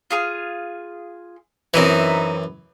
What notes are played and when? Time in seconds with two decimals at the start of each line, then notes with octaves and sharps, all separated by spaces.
0.11 F4 G#4 F6
1.74 F#2 E3 C4 D#4 E4